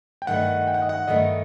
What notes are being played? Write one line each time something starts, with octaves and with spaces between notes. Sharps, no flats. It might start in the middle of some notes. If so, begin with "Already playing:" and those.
G5
G2 D#3 A3 D#4 F#5
G5
F#5
D#5
F#5
G2 D#3 A3 D#4 D#5